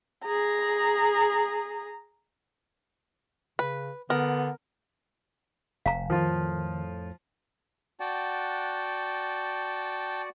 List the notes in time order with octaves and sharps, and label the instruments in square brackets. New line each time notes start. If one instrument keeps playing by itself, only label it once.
[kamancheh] G#4 A#5
[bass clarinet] C#3 [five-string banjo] B4
[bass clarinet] D3 [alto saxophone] B3 [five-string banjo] A#4
[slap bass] F1 [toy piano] F5 A#5
[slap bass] F2 A2 [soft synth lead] D#3 [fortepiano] F3 F4
[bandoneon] F#4 D5 F#5 [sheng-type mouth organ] G5 A5